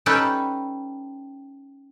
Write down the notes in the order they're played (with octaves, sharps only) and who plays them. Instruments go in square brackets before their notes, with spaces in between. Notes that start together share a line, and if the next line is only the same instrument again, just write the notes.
[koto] G3 C#4 D#4 A4 B4 G5